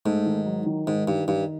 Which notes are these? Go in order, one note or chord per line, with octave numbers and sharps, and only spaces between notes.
G#2 A3
D#3
F#3
D#3
G#2 D#3
G2 D#3
G2 D#3